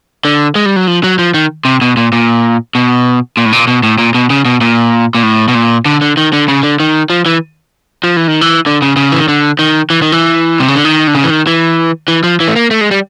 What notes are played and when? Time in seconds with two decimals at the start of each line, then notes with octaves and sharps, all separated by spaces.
0.25 D3
0.55 G#3
0.66 G3
0.76 F#3
0.87 F3
1.04 F#3
1.19 F3
1.34 D#3
1.65 C3
1.81 B2
1.97 A#2
2.13 A#2
2.75 B2
3.37 A#2
3.45 A2
3.52 A#2
3.67 B2
3.83 A2
3.98 A#2
4.15 B2
4.30 C#3
4.45 B2
4.61 A#2
5.15 A#2
5.23 A2
5.48 B2
5.55 A#2
5.86 D3
6.01 D3
6.17 D#3
6.33 D3
6.48 C#3
6.63 D3
6.80 D#3
7.10 F3
7.26 E3
8.04 F3
8.17 E3
8.28 D#3
8.41 E3
8.66 D3
8.82 C#3
8.97 C#3
9.12 E3
9.20 D#3
9.29 D3
9.59 D#3
9.90 E3
10.02 D#3
10.12 E3
10.60 C3
10.68 C#3
10.76 D3
10.85 D#3
11.07 D3
11.15 C#3
11.24 E3
11.30 D#3
11.47 E3
12.08 E3
12.24 F3
12.40 E3
12.48 A3
12.56 A#3
12.71 A3
12.81 G#3
12.91 G3